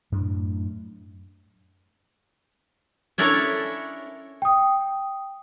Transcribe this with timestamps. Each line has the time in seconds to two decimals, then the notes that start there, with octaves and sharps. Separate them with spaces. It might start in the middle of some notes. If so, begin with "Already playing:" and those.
0.12 F#2 A2 D4
3.18 C#4 D4 E4 A4 A#4 C#5
4.42 G5 D#6